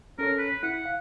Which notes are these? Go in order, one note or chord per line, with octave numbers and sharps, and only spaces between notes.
C#4 A4 A#4 C#5
B4
E4 F#5
F5